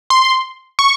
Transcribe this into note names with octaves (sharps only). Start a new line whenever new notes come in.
C6
C#6